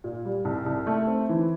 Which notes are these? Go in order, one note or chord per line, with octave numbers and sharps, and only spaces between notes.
A#2
G3
C2
C2
A3
C4
E3